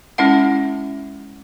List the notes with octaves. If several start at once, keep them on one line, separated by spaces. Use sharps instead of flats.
G#3 C#4 E4 E5 F#5